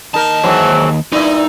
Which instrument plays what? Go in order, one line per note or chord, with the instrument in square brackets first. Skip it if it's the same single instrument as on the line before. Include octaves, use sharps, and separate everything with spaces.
[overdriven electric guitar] D#2 A5 [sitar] D#4 A#4
[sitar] G#2 E3 F#3
[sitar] G2 A#2 E4 [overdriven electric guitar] D#4